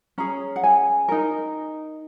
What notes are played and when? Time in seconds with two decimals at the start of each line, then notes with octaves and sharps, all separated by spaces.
0.18 C#4 G#4 A#5
0.56 F#5
0.64 G#5
1.08 D#4 A#4